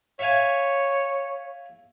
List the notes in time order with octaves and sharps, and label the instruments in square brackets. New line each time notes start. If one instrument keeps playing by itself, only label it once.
[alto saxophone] C#5 [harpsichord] E5 F5 G#5